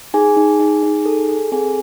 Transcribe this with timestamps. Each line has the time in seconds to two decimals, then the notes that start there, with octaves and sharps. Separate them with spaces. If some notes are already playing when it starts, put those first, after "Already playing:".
0.14 D#4 G#4 G#5
0.37 D#4
0.60 D#4
0.83 D#4
1.06 A4
1.29 A4
1.52 C4 G#4 G#5